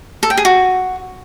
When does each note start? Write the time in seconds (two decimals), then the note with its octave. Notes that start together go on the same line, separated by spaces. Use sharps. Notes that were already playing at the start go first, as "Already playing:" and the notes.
0.23 A4
0.30 G5
0.37 G#4
0.45 F#4